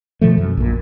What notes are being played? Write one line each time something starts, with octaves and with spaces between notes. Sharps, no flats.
B2 D#3 F3 A3
F#2
A#1 A#2